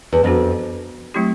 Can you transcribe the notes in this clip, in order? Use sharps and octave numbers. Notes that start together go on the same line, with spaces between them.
E2
F2 B3 D4 F#4
F#3 A3 C4 E4 G4